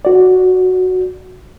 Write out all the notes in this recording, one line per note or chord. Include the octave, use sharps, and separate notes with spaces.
F#4 D5